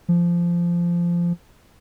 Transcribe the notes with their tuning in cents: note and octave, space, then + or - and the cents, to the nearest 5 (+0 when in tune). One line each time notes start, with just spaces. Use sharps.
F3 -15